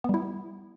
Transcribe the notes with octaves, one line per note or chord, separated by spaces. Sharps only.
G3 B3 E4